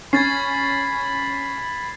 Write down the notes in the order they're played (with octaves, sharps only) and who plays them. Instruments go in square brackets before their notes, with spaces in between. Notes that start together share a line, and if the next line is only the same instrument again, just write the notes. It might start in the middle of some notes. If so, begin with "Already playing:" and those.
[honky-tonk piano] C#4 [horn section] B5 [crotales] G#6 A6 C7